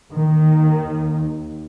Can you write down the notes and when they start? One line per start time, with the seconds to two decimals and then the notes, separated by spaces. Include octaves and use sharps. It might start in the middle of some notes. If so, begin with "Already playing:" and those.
0.11 D#2 D#3